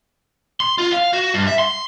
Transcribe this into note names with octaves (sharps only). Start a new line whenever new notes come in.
C6
F4
F5
F#4
G2
E5
C6